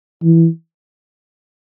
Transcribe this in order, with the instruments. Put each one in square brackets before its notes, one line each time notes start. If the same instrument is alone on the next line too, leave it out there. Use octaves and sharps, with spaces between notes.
[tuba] E3